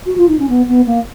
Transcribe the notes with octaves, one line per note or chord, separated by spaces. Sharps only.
F#4
F4
D#4
C#4
B3
B3
A#3